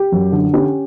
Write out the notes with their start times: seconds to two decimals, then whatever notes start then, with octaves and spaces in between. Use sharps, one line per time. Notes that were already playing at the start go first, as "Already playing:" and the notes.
Already playing: G4
0.12 F#2
0.32 D3
0.53 C#4 G4